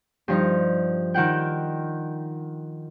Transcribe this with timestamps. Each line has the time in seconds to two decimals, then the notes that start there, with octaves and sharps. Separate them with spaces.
0.28 G2 F3 D#4
1.14 D#3 F4 F#5 G5